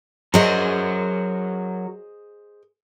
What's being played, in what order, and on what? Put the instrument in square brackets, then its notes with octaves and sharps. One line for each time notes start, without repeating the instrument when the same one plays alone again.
[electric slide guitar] F#3 F#4 A#4 [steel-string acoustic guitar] G#4 C5 D#5